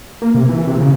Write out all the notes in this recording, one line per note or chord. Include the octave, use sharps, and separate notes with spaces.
A#3
C3
E3
C3
C#3